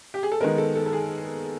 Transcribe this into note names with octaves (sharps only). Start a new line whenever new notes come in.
G4
G#4
A4
D#3 G#3 B3 A#4
A4
A4
A4
G#4